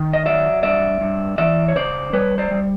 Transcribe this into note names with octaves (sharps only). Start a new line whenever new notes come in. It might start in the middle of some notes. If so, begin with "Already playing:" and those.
Already playing: D#3
D#5
F#3 D5 E5
G2 D5 E5
G2
E3 D5 E5
C#5
C#3 C5 D5
G3 B4 C#5
C5 D5
G3